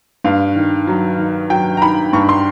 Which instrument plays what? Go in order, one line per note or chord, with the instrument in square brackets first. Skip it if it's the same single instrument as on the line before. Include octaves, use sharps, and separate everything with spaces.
[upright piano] G2 F5
D#3
F#3
D#3
F#3 G5
A#5
D#3 B5
G2 C#6
C6